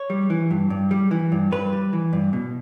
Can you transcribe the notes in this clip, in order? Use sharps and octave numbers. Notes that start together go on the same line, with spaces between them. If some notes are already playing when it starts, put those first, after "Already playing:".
Already playing: C#5
G3
E3
G2
G2
G3
E3
G2
G2 B4
G3
E3
G2
B2